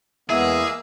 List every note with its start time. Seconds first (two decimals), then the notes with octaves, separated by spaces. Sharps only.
0.30 E2 G#3 A#3 B3 E4 G#4 E6